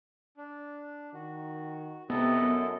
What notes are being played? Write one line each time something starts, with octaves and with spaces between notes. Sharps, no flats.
D4
D#3 F#4
C3 B3 E4 A4 D#5
F#2